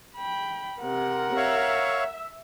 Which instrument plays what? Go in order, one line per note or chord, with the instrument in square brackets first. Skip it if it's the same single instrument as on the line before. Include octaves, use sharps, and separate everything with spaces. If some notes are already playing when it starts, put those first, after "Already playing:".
[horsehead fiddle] G5 B5
[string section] C3 [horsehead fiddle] A#4 F#5
[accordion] C#5 F5 C#6 [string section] E5